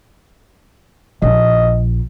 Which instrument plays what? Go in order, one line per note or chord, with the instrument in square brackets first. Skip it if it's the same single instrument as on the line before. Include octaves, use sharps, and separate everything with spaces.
[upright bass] A#1 [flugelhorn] D#5